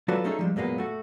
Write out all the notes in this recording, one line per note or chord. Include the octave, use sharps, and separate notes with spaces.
F#3 F4 F#4 A4 B4 D5
A3 C#4 D#4 G#4 A4
F3 G3 G#3
F#2 A#2 G#3 A#3 B3
A3 F#4